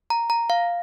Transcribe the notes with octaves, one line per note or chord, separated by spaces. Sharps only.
A#5
A#5
F5